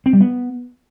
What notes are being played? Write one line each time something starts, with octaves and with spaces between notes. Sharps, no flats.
C4
G3
B3